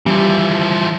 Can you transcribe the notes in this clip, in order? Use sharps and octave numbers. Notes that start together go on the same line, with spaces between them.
E3 F3 G3